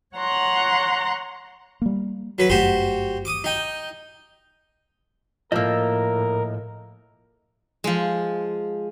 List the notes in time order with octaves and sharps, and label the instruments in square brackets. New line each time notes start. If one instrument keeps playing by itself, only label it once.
[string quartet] C#5 F#5 A#5 C6 F#6
[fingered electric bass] G3 A#3
[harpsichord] F#3 B4
[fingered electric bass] G1 F#2 A3 [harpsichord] F#4 G4 C5
[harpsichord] D6 D#6
D#4 G5
[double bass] A2 [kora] F3 A#3 [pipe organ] A#4 [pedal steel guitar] D#5 E6
[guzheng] F3 G#3